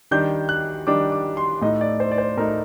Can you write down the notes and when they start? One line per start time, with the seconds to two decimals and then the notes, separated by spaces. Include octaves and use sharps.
0.11 D#3 G3 D4 G6
0.49 F#6
0.87 D#3 G3 D4 D6
1.12 D6
1.37 C6
1.61 A2 A3 D#4 D#5
1.81 D5
2.00 C5
2.12 D5
2.18 C5
2.37 A2 A3 D#4 A#4